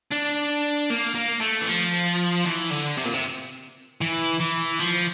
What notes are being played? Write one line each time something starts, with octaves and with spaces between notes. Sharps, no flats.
D4
A#3
A#3
A3
E3
F3
E3
D3
C3
A#2
C3
E3
E3
F3